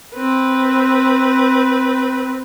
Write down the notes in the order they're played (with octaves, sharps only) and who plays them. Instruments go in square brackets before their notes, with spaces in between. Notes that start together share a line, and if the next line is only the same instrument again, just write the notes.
[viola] C4 B4